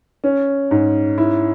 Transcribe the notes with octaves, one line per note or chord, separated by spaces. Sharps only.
C#4
G#2
E4